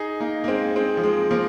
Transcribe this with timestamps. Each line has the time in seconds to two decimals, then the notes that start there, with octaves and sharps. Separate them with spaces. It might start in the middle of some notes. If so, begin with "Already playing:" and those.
Already playing: D#4 G#4
0.20 A#3 D#4
0.44 A#3
0.48 G#3 C4
0.76 G#3 C4
0.97 F3
1.03 G#3
1.31 F3 A#3